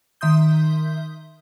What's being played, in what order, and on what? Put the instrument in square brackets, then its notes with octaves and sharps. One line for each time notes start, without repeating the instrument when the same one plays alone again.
[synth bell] D#3 E5 C6 D#6 G6